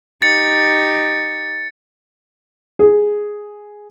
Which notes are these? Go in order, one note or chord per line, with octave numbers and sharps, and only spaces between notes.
D#4 G4 A6 C#7
G#4